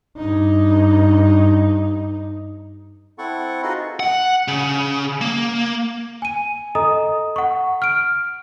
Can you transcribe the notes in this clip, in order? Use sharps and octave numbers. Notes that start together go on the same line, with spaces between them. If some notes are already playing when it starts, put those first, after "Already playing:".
G2 D#4
C4 E4 A4 F#5 C#6
D#4 F4 F#4 G#4 B4 D#5
F#5
C#3
A#3
G#5 D#7
A4 D#5 A#5 D#6
F#5 C#6
F6 D7